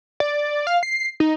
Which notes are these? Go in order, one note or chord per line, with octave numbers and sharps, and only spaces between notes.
D5
F5
C7
D#4